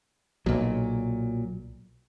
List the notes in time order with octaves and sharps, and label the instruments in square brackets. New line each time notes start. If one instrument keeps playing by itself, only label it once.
[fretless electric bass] B1 [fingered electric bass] A#2 F#3